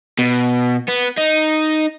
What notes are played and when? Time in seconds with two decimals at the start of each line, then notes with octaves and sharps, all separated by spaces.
0.19 B2
0.88 B3
1.17 D#4